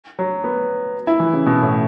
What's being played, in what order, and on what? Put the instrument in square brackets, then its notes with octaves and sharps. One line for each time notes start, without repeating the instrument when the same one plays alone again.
[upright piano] F#3
B3
E4
E3
C#3
B2
A2